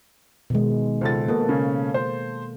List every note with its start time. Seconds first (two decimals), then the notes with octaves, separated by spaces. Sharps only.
0.50 B2 D#3 G#3
1.01 C#2 A4 C5 A6
1.28 B2 A#3 A4
1.49 C#3 C#4
1.94 C5